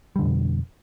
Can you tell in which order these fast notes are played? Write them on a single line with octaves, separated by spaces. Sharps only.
G3 D3 F2 B2